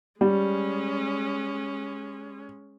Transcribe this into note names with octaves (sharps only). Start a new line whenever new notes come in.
G3 G#3 C#4